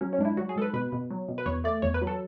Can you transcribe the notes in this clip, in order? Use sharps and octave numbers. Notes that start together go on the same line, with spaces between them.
F#3 C#4
C#4
G#2 D4
E4
F#3 F#4
G#4
G#2 A4
B4
B2 B4
B2
F#3
B2
B4
E2 C#5
A3 D5
E2 C#5
B4
F#3
A4